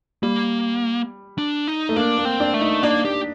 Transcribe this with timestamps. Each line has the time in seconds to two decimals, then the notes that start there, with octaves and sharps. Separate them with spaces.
0.23 G3 A#3
1.38 D4
1.68 D#4
1.89 A3
1.96 A#3 D4
2.18 A#3
2.25 C4
2.40 D4
2.54 A3
2.61 D#4
2.83 A#3 D4
3.05 G4